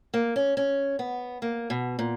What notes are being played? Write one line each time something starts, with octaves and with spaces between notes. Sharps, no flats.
A#3
C#4
C#4
B3
A#3
B2
A#2